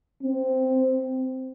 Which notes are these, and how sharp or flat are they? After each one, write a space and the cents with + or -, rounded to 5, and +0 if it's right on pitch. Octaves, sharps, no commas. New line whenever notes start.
C4 -5